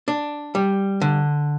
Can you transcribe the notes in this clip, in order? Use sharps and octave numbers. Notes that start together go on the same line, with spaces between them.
D4
G3
D3